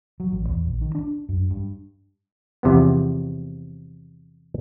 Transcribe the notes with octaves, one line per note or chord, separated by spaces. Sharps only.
F#3
A1
E2
A#1
D#3
D4
F#2
G2
E2 C3 F3 B3